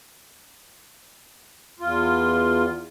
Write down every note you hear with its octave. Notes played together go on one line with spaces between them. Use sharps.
E2 F4